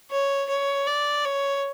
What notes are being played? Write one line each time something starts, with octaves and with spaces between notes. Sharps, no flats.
C#5
C#5
D5
C#5